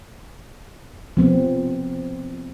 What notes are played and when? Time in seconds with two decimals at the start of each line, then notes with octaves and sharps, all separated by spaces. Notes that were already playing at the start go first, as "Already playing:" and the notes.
1.17 F3 B3 C4